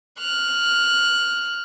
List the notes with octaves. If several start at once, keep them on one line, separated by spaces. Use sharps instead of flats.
F6 F#6